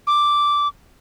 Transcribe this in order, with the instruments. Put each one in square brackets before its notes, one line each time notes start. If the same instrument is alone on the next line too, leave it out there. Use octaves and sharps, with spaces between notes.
[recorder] D6